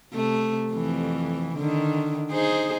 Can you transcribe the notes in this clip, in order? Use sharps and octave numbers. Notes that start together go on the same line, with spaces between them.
C3 A3
F2 E3
D3 D#3
D#4 G#4 C5